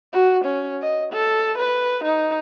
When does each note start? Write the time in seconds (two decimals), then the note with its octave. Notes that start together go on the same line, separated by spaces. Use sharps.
0.13 F#4
0.44 C#4
0.82 D#5
1.13 A4
1.58 B4
2.04 D#4